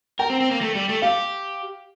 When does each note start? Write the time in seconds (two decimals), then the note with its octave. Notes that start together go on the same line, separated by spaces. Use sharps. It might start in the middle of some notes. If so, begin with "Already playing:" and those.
0.19 A#4 G5
0.30 C4
0.40 C4
0.51 A#3
0.61 A3
0.75 G3
0.89 A3
1.02 G4 F5